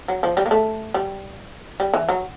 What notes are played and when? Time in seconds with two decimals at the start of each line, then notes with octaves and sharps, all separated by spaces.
0.08 F#3
0.23 F3
0.37 G3
0.46 A#3
0.51 A3
0.94 G3
1.80 G3
1.94 E3
2.09 F#3